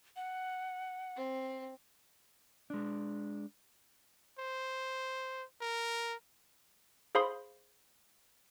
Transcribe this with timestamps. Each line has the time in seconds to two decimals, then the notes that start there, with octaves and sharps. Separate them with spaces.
0.16 F#5
1.16 C4
2.70 G#3 D4
4.39 C5
5.62 A#4
7.15 G#4 C5 F5 B5 C6 D#6